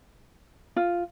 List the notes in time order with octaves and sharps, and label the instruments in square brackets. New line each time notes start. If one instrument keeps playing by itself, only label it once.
[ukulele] F4